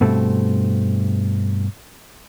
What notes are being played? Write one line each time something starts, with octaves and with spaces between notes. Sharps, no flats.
G2 B2 A3 C4